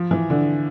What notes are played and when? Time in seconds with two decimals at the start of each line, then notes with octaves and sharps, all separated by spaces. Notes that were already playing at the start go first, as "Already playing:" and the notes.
Already playing: F3
0.11 E3
0.30 D3